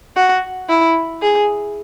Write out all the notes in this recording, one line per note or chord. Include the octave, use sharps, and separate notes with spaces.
F#4
E4
G#4